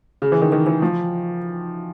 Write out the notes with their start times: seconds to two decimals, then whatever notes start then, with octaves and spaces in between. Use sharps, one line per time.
0.22 C#3
0.32 E3
0.41 D#3
0.52 D#3
0.66 E3
0.82 F3